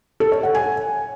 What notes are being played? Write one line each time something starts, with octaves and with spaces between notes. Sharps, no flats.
A4
C#5
F#5
G#5